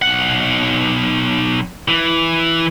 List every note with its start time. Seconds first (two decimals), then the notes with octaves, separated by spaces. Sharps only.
0.02 B1 F#5
1.88 E3